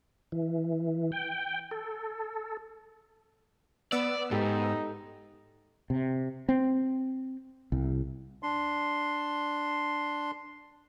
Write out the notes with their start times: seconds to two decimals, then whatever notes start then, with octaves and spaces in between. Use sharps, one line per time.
0.32 E3
1.12 G5
1.71 A4
3.92 B3 D5 E6
4.31 G#2 D#4 G4 A4
5.90 C3
6.49 C4
7.72 C2
8.43 D4 C6